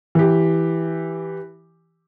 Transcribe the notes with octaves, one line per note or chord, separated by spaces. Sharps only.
E3 G4